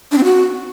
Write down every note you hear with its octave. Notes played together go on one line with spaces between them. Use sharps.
D4
C4
F#4